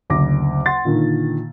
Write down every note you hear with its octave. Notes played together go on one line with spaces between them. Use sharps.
F#1 D2 D6 A#6
F#5 C6 A6
A#2 D3 D#3